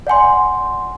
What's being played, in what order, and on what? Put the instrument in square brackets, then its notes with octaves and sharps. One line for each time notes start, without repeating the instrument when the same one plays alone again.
[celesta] D5 F#5 G#5 C6